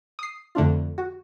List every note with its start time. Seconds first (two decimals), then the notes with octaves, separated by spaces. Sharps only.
0.19 D#6 C7
0.55 F2 D3 A3 D4 F4
0.98 F#4